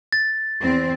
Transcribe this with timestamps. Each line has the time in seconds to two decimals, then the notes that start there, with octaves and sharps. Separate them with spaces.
0.13 A6
0.62 E2 C4